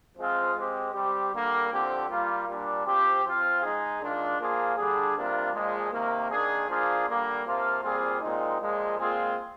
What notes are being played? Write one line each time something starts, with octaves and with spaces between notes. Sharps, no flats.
F3 G#3 C4 F4 G#4
G#3 C4 G4
G3 C4 G4
D3 G3 A#3
D3 F3 C4 G4
G3 A#3 F4
A#2 G3 D4
F3 C4 G4
F3 C4 F4
G#3 D#4 G#4
D#3 G#3 D4 F4
A#2 F3 A#3 F4 G#4
D3 G3 D4 G#4
C3 G3 A#3 D4 F4
A#2 F3 G#3
C3 D#3 A#3
D#3 A#3 D4 G#4
F3 A#3 D4 F4 G#4
D3 G3 A#3
C3 F3 A#3 F4
A#2 G3 C4 F4 G#4
A#2 G#3 C4 D#4
A#2 F3 G#3
A#2 G#3 C4 F4 G#4